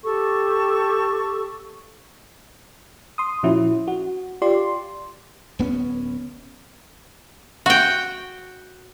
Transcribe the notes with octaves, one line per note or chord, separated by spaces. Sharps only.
G4 A4 C#6
C6 D#6
A#2 F3 C#4 E4 F#4
F#4
F4 G4 D5 C6
D1 B3 C#4
F#4 G5